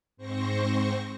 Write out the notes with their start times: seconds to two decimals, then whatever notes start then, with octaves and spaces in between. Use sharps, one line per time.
0.17 G#2 C4 C5 C#6 A#6